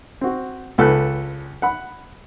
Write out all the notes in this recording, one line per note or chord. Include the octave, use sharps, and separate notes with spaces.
C4 F#4
C#2 A4 B4 F#6
F#5 B5